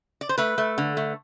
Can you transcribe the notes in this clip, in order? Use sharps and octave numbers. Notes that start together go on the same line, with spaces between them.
D5
C5
A3 B4
A3
D3
A3